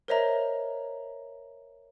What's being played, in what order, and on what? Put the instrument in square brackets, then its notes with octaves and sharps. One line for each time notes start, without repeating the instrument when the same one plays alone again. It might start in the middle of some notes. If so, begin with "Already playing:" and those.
[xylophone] A#4 C5 C#5 D#5 E5 A#5